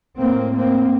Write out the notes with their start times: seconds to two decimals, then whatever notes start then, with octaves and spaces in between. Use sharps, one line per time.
0.18 A2 A#3 C4
0.55 A#3 C4